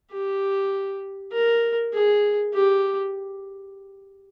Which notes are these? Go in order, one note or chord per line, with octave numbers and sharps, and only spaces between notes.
G4
A#4
G#4
G4